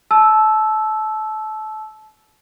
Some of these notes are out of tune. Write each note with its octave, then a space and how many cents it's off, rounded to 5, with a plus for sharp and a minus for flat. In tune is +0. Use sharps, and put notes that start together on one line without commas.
A5 -25 E6 +0